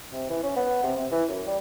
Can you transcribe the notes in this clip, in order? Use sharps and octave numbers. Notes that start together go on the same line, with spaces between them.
C3
E3
C#4
B3
C3
C3
E3
F#2
G3